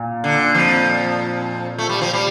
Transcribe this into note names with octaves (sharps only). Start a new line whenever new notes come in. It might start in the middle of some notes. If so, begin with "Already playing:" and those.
Already playing: A#2
D3
F2 F3
A3
G3
F3
G3